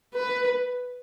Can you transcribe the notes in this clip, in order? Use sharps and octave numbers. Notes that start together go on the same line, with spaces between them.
B4